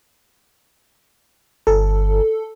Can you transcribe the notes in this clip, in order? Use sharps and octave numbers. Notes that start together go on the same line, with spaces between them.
G1 A4